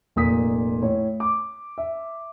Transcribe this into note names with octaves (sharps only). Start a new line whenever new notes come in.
F1 A#2 D#6 B6
A2 C#5
D6
E5